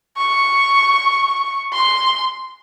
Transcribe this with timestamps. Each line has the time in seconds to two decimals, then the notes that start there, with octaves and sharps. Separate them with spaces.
0.17 C#6
1.73 C6